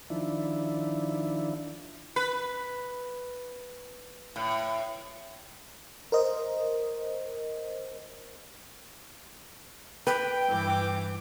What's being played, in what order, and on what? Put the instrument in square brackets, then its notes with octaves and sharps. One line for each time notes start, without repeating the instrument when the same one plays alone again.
[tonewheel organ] D#3 F3 D4 E4
[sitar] B4
A2
[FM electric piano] A#4 C5 D#5
[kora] B4 [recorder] G5
[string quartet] G2 E3 D6